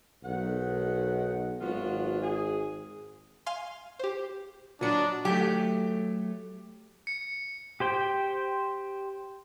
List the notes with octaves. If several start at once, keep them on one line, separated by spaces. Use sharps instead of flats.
B1 G#2 D#3 F#5
G#1 F#3 B3 F4
G#4
F5 G#5 C6
G4 C5
A#2 F#3 D4 D#5 B5 C#7
F#3 A3 G4
C#7
G4 C5 G5